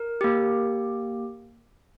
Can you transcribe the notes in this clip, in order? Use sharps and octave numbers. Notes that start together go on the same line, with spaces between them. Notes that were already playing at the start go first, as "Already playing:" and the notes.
Already playing: A#4
A#3 G4